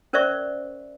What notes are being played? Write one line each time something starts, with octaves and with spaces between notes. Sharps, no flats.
C#4 A#4 C5 D5 E5 C#6